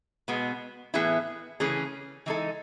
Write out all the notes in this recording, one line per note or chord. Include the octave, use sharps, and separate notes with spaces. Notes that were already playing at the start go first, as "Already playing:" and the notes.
B2 G#3 B3
A2 E3 B3 E4 G#4
C#3 E3 A3 C#4 G#4
E3 G#3 D#4 A4